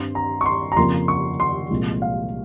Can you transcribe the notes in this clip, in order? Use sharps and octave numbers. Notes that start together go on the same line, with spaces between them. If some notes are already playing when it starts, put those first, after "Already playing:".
Already playing: G2 G3 C4 C6
A#5
C#6
C6
A#5
F2 C#3 F3 A#3 C6
C#6
C6
C2 A#2 F3 G#3
F5